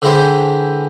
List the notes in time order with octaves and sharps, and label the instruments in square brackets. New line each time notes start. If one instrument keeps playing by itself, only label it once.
[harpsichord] D3 E3 G#3 E4 G4 C5